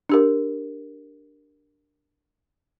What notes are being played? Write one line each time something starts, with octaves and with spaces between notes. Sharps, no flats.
D4 G4 A#4